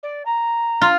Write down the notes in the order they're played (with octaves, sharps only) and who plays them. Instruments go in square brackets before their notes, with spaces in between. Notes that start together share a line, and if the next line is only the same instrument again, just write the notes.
[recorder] D5
A#5
[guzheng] F4